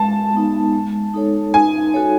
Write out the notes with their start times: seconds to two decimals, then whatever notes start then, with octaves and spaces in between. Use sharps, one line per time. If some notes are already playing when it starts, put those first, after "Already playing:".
Already playing: G#3 A5
0.34 B3 D#4
0.73 G#3
1.14 D#4 A4 C#5
1.54 D#4 G#5
1.94 F#4 A4 C#5